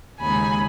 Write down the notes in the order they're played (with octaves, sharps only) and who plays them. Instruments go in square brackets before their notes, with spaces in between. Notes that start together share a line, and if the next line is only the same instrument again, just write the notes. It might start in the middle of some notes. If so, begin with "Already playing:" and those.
[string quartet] D#2 C#3 G#3 D#4 G#5 B5